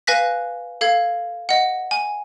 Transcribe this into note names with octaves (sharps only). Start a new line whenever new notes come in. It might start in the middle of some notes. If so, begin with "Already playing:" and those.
B4 F5 G#5 F#6 A#6 B6
A4 F5 G#6
D#5 F#5
G#5